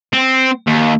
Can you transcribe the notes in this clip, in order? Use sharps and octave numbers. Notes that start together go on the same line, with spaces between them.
C4
D#2